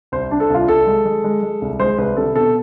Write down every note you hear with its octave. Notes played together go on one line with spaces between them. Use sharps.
C2 C5
D4
A4
C2 F4
C2 A4
G#3
G#3
G#3
G#3
C2
G#3 C5
C2 B4
C3 A4
B2 A4